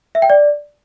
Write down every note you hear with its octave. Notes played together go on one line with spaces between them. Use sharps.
E5
G5
D5